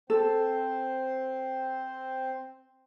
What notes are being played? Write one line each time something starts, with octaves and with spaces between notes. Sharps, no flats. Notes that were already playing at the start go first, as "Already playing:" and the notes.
C4 A4 C5